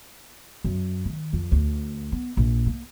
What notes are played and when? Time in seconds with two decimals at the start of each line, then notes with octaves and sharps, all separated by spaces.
0.64 F#2
1.05 D#3
1.33 F2
1.52 D2
2.12 B3
2.37 A#1
2.66 A#3